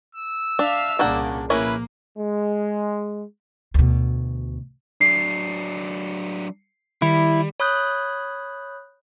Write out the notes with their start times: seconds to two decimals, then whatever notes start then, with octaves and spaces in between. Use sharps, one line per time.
0.15 E6
0.59 D4 E5 F5 F6
0.99 C2 A#2 C#3 A#3 D4 F#5
1.50 A#1 A#3 C#4 E4 A#4 B4
2.18 G#3
3.74 D2 B2
5.01 F#3 D4 C7 C#7
7.02 D#3 G3 E4
7.60 C#5 B5 D#6 F#6 G6